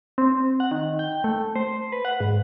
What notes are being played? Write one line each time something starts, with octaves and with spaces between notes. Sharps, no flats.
C4
F#5
D#3
G5
A3
C5
B4
F#5
G#2